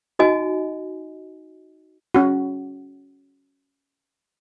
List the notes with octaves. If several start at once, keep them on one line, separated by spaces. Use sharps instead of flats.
D#4 F#4 D#5 G#5
C#4 F#4